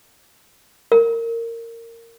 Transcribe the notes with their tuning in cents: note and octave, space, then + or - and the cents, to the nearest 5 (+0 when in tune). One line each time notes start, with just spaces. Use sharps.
A#4 -20